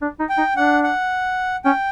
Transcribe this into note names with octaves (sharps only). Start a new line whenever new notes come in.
D4
D#4
G5
D#4
D4 F#5
F#5
C#4 G5